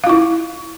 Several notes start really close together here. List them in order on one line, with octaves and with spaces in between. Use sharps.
F5 F4 E4